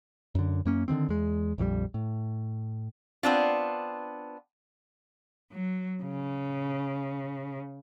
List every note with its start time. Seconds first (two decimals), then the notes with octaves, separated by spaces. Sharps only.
0.35 F#2 D3
0.65 F#2 A#3 C#4
0.88 D3 D#3 F3 C4
1.09 E2 G#3
1.58 A#1 F2 D#3 G3
1.94 A2
3.23 B3 C4 D4 F4
5.52 F#3
6.03 C#3